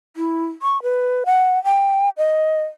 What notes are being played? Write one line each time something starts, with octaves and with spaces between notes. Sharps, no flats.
E4
C#6
B4
F#5
G5
D#5